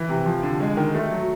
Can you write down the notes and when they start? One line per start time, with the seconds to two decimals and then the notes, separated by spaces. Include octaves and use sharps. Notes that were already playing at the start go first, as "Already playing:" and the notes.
Already playing: E3
0.09 C3
0.26 F3
0.43 D3
0.60 G#3
0.77 D#3
0.95 A3
1.11 F#3